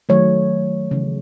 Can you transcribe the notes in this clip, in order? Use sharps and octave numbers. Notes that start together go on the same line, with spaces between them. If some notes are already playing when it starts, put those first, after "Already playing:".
D#3 F#3 A3 C#5
C#3 E3 A3